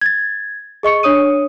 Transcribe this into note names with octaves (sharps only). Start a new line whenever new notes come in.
G#6 A6
G#4 D#5 C#6 C#7
D4 C#5 D#6 D#7